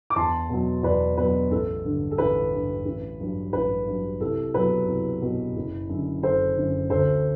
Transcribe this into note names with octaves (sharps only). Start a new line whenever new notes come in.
D6
E2 A5 C6
B2 F#3
E2 B4 D5
B2 F#3 B4
A1 A4
G2 D3
A4
A1 B4
G2 D3
A1
G2 F#3
A1 B4
G2 F#3
C2 A4
B2 F#3 B4
C2
B2 F#3
F#1
F#2 D3
F#1 A4 C5
F#2 D3
D2 A4 C5